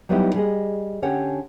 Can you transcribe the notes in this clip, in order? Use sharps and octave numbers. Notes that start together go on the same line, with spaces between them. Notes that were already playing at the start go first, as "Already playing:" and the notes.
F#3 G3 B3 D#4 E4 G4
G3 G#4 D#5
D3 C#4 G4 C#5 F#5